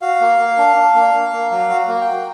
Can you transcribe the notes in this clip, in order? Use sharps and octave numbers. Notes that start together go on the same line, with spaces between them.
F#4 F5
A#3
A#3
D4
D4
A#3
A#3
A#3
F#3 F5
F#4
A#3
G5
F#4